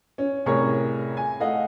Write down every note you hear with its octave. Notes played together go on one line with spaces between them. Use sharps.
C#4
C2 A2 G#4 A#4 C#5 C#6
G#5
A3 D#5 F5 F#5